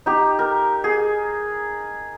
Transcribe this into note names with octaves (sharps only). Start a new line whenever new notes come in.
D#4 G4
A#4
G#4